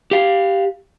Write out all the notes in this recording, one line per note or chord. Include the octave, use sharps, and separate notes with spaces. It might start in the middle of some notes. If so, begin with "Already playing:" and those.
G4 F5